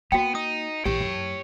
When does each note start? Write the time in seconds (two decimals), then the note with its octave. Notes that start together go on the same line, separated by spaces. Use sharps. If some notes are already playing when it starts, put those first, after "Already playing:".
0.12 A#3 B3 F#4 G5
0.35 D#4 D#6
0.85 A#1 E3 G4 C#5 G5
1.00 F#2